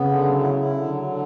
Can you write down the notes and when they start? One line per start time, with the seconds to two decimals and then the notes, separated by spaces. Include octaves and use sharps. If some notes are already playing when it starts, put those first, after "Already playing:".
Already playing: C#3 B3
0.08 D3
0.24 F#3
0.39 E4
0.56 E4
0.71 D3
0.87 F#3
1.03 D3